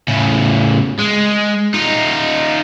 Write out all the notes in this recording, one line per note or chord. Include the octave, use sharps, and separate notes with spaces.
A2 C#3
G#3
D#4 F4